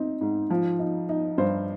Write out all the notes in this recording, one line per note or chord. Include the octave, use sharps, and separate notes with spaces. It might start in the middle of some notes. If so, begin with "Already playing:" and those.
Already playing: C4 D#4
G#2
F3
D#4
D#4
G2 C5